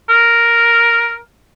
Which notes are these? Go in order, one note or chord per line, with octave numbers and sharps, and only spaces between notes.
A#4